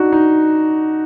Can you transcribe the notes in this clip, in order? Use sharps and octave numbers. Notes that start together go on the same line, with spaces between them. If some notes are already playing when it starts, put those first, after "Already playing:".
Already playing: D4 D#4 F#4
D#4